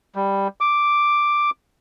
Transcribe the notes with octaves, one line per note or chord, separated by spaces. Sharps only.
G3
D6